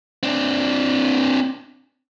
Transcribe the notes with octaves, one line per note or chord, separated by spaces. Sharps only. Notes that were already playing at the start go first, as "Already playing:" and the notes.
C4 D4